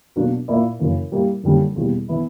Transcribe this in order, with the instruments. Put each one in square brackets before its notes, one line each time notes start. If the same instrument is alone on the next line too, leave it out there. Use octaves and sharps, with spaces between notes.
[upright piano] B2 F#3 A#3 D4 F#4
A#2 A#3 E4 A#4 D5
F#2 C#3 E3 A#3
G3 A#3 E4 G4
F#2 D3 G3 A#3 C#4
E2 B2 G3 A#3
E3 B3 E4